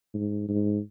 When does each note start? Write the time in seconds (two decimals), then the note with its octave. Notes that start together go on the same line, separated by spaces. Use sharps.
0.14 G#2
0.49 G#2